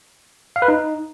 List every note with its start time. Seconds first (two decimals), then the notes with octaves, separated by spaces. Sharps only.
0.56 F5
0.62 B4
0.68 D#4